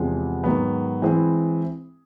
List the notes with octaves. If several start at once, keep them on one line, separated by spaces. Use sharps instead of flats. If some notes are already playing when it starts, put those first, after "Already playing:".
Already playing: E2 C3 F3 G#3
G#2 D#3 F#3 B3
E3 G#3 C4 E4 G#4